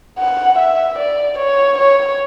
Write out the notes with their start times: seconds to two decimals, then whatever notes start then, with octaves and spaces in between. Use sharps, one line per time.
0.19 F#5
0.59 E5
0.99 D5
1.38 C#5
1.78 C#5